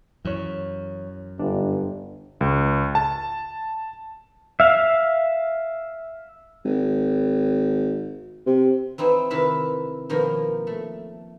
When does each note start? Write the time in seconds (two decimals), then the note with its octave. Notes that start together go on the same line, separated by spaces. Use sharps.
0.25 F#2 E3 C#5
1.39 G1 D4
2.41 C#2
2.95 A5
4.60 E5 F5
6.65 G#1
8.46 C3
8.98 E3 C4 D#4 E4
9.30 C3 D#3 E4 B4 E5
10.09 B2 D#3 F3 A#3
10.67 A3